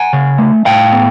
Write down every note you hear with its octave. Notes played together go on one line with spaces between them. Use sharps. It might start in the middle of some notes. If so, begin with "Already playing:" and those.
Already playing: F#5 G#5
C#3
A3
A2 F5 G5
B3